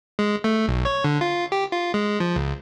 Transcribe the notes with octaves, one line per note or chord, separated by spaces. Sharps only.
G#3
A3
B1
C#5
D3
F4
G4
F4
G#3
F3
C#2